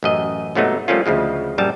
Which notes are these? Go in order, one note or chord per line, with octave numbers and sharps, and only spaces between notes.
A1 F#2 D#5
G#2 C3 F#3 A3 B3 D#4
F3 G3 A3 A#3 C#4 F4
D2 C#3 F3 G#3
A#1 F#2 G3 A5